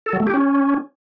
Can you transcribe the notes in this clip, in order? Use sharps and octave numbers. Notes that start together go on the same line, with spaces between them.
A4
F#3
A3
G4
C#4